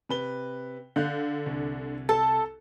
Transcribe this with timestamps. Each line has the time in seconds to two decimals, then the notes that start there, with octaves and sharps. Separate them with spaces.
0.09 C3 B4 G7
0.96 D3 F5 F#6 G6
1.46 C2
2.09 A4 A5